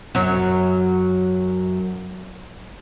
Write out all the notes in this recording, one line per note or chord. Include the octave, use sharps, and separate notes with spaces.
F#2 F#3